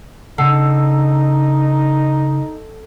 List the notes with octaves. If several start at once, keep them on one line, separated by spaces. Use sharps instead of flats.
C#3 D4 D#4 A4 F#5 E6 C7